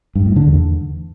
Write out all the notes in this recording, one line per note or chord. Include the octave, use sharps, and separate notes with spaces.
G2
A2
D3
E2